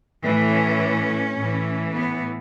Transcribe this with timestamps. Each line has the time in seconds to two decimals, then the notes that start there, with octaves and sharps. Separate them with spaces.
0.22 A2 E3
0.51 C#4
1.37 A2 E3
1.93 B3